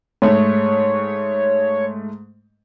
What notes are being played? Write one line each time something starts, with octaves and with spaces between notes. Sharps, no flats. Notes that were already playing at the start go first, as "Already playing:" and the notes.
G#2 A3 C#5